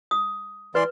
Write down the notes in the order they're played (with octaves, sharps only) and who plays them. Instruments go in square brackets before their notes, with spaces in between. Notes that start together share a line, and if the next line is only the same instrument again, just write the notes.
[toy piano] D#6
[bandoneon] E3 D5 C6 [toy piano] B4